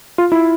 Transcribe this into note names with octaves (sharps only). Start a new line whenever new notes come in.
F4
E4